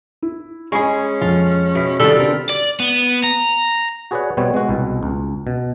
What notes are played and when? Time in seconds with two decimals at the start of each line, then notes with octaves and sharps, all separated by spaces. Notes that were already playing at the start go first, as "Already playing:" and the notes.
0.22 E4
0.72 G#3 C#4 G#4 D#5 B5 C#6
1.21 F2 F4
1.75 B2 E5 B6
2.00 C3 D#3 G3 F4 A4
2.19 D3 C4 A#4
2.49 D5
2.80 B3
3.23 A#5
4.11 F#4 G#4 B4 C#5 D5 F#5
4.37 B2 G3 B3 C4 C#5
4.54 G#3 F#4
4.69 C2 B2
5.03 C#2
5.47 B2